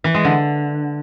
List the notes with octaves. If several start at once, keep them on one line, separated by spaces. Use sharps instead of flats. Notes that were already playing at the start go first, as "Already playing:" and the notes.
E3
G#3
D3